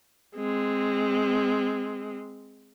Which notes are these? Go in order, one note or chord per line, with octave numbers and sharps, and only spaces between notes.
G#3 C4